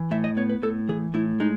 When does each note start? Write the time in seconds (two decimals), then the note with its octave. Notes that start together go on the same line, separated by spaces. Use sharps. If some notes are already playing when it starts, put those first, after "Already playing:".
Already playing: E3
0.11 A2 E5
0.24 D#5
0.37 B3 C#5
0.50 B4
0.62 A2 A4
0.89 E3 G#4
1.14 A2 E4
1.40 G#3 D#4